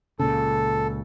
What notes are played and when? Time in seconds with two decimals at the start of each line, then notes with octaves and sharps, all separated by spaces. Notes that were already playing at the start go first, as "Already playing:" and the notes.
0.19 C#2 A#2 C#3 A4